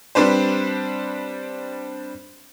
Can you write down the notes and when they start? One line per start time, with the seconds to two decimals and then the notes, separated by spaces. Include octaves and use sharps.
0.15 G3 C4 D4 B4 C5